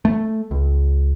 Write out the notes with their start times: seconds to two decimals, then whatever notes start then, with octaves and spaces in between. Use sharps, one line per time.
0.05 A3
0.51 C#2